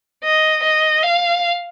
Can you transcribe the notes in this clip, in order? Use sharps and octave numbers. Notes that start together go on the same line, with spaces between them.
D#5
D#5
F5